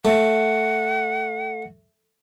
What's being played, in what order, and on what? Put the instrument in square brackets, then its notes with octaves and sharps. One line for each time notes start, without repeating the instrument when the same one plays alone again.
[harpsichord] A3 [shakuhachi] F#5